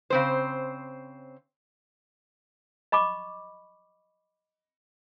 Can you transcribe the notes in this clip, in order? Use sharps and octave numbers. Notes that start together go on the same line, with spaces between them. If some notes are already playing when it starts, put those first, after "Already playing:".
C#3 C4 C5
D#5 B5 C#6 D6